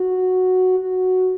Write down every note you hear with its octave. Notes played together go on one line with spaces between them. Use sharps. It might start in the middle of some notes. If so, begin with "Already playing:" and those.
Already playing: F#4
F#4